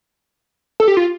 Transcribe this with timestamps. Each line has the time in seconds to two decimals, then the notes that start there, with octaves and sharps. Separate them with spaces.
0.80 A4
0.88 G4
0.97 F4